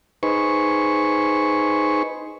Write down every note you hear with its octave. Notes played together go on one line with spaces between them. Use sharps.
D#4 G#4 B4 C5 C#6